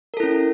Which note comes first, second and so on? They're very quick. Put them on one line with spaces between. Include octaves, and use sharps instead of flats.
A#4 A4 E4 C#4